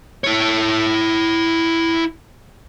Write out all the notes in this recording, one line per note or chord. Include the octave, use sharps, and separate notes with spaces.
E4 C#5